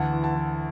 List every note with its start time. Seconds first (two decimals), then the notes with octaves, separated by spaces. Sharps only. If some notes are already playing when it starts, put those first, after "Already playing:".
Already playing: D2 E3 F#5 A5
0.12 E3
0.24 F#5 A5
0.35 E3